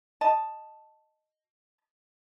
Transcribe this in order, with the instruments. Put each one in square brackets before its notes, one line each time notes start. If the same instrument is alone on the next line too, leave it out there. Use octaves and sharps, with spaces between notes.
[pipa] D#5 A5